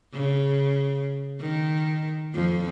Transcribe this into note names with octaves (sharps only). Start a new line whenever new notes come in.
C#3
D#3
F2 F3